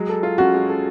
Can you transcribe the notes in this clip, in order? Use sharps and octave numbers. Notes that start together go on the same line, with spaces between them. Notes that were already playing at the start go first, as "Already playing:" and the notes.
Already playing: F#3 G#3
A4
F4
C#4 F#4
G#3
A4